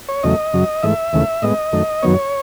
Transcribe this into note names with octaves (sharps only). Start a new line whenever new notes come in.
C#5
E2 C#3 F#3 A3 D#5
F#2 C#3 F#3
G#2 E3 A3 E5
D#2 C#3 E3 A3
A2 G#3 B3 D#5
F#2 D#3 A3
F#2 D#3 F#3 B3 C#5